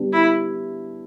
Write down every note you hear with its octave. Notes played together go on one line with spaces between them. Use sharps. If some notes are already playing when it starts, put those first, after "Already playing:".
Already playing: D3 G3 B3 D4
E4